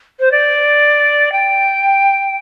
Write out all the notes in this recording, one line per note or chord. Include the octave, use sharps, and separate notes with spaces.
C5
D5
G5